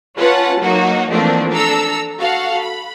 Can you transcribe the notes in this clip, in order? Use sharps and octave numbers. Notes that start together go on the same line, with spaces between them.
C#4 F4 B4 F#5 A5
F#3 A#3 D#4 F#4
E3 F3 A3 A#3 C4 D4
D4 A4 A#5 E6
F#4 A4 F5 F#5
B5